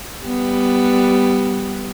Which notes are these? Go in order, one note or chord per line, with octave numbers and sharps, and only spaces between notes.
G3 B3